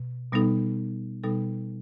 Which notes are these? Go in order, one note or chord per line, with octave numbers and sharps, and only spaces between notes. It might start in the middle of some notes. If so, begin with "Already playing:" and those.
Already playing: B2
B2 G3 B3 D#4 A4
B2 G3 B3 D#4 A4